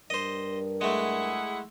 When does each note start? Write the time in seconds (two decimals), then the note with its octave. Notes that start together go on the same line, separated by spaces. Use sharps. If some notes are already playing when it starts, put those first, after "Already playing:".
0.10 G2 A#4 C5 D#5
0.81 G#3 A3 E4 G#4 F#5